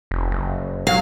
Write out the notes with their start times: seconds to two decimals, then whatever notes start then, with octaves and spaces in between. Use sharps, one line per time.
0.11 F1
0.31 F#1
0.87 F#3 F5